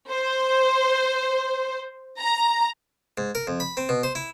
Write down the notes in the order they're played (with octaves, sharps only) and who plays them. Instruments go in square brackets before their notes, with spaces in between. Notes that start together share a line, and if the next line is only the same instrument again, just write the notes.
[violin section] C5
A#5
[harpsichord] G#2
A#4
F2
B5
C4
B2
C5
E4